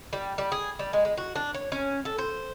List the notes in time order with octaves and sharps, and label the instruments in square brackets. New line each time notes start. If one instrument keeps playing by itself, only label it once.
[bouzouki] G3
G3
G#4
G3
G#3
G#3
F#4
D4
C#5
C#4
A4
C5